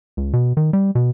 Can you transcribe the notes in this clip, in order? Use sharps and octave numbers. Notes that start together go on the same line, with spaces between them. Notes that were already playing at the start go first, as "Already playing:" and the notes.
C#2
B2
D#3
G3
B2